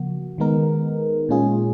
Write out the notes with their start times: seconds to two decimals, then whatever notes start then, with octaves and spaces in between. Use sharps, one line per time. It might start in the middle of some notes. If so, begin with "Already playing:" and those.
Already playing: C#3 F3 A#3 F#4
0.38 D#3 G#3 B3 D#4 A#4
1.29 A#2 G#3 C#4 F4 G#4